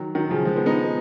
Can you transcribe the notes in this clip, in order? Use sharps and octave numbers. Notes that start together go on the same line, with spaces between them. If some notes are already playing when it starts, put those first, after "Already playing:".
Already playing: D#3 F#3
D#3 F#3
C#3 F3
F3 G#3
G#3 B3
B3 D#4